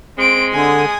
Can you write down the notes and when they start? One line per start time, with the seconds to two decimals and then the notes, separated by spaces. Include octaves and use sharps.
0.18 G#3 C4 D7
0.53 D3 G#5 D#6